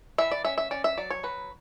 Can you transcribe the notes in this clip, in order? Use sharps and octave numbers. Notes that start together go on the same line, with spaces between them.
E3 E5
D5
C#4 E5
E5
C#4 D5
E5
F#3 D5
C#5
F#3 B4